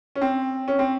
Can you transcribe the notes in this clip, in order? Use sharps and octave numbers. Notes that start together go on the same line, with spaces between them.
C#4
C4
C#4
C4